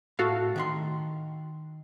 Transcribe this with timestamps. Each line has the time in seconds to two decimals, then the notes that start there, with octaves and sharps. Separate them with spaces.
0.19 A2 F#4 A4 F5
0.56 D#3 E5 C6